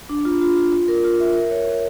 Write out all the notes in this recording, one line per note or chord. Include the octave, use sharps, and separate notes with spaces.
D4
F4
F4
F4
F4
A#4
F4
E5
A#4
C#5
C#5